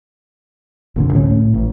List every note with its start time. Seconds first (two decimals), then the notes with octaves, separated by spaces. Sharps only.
0.96 F1 A#2 D3
1.13 C2 A2 G#3 C#4
1.30 A2
1.54 A1